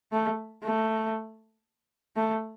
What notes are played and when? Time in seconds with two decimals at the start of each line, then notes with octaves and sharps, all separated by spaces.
0.12 A3
0.63 A3
2.16 A3